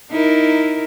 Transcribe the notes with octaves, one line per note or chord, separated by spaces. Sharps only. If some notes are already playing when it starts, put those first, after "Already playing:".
D#4 E4 A#4